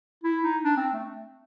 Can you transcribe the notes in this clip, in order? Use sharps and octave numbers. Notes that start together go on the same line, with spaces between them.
E4
D#4
D4
C4
A3